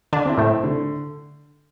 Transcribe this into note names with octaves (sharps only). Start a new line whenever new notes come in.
D3 D4
C4 E4
A2 A3
D3